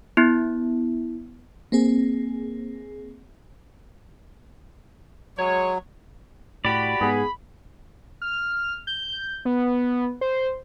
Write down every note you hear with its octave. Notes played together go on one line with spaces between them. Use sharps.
B3 E4
A#3 C4 G#4
F#3 G#3 C#5
A2 F#4 G4 D5 B5
G#2 B3 G#4
F6
G6
B3
C5